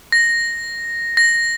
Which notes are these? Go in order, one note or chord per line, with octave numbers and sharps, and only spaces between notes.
A#6
A#6